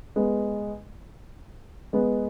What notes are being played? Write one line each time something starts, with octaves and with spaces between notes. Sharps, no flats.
G#3 B3
G#3 B3